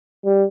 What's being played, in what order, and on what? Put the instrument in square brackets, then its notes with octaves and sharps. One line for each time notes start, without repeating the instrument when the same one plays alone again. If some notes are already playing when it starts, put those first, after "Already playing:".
[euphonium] G3